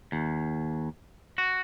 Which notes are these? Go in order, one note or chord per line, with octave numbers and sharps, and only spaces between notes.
D#2
F#4